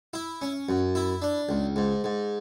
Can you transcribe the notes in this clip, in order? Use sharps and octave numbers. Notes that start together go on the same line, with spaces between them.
E4
C#4
F#2
E4
D4
C#2
G#2
G#2